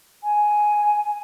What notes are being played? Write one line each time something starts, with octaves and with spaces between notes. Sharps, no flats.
G#5